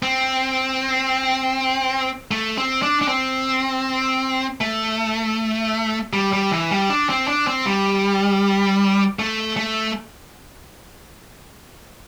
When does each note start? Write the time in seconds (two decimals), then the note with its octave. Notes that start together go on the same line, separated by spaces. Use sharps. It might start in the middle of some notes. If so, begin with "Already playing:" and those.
0.03 C4
2.31 A3
2.57 C4
2.82 D4
3.02 D4
3.08 C4
4.61 A3
6.13 G3
6.33 G3
6.52 E3
6.71 G3
6.90 D4
7.09 C4
7.28 D4
7.47 C4
7.66 G3
9.19 A3
9.57 A3